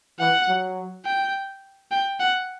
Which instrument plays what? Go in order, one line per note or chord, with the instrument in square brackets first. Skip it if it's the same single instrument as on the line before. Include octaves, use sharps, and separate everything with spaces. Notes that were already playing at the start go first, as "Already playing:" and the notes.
[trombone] E3 [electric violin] F#5
[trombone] F#3
[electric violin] G5
G5
F#5